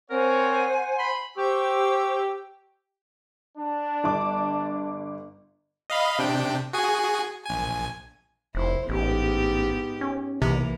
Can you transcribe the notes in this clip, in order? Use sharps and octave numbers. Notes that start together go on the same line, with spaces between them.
C4 A#4 C5 C#5 F#5 G#5
B5 C6
G4 C5 C#6 E6
D4
G1 D6
D#5 F5 B5
C3 D4 G5
F#4 G#4 G#5
A#1 G#5
F1 E4 C5
A1 G#2 B3 G4
C#4
B1 C3 E3 A#3